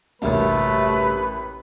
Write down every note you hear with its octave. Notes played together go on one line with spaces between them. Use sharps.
A1 D2 G2 C3 A3 A#3 B4